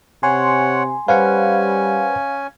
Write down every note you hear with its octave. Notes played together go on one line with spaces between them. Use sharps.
C3 C#5 F#5 G#5 C6
G3 C#4 B4 C5 F5 F#5 G#5